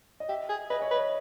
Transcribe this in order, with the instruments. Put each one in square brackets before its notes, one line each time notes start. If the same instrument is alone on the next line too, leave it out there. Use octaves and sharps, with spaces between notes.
[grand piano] D#5
[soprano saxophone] G4 [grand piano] E5
[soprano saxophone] G#4
[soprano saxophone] B4 [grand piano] D#5
[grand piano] C#5
[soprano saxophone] B4
[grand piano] D#5